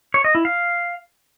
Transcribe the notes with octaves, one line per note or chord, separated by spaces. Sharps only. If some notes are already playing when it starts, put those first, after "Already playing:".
C#5
D#5
E4
F5